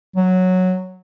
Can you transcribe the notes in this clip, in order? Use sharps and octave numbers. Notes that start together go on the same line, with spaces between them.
F#3